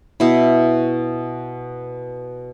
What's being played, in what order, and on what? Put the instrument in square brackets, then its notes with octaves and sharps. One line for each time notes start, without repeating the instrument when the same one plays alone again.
[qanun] B2 E4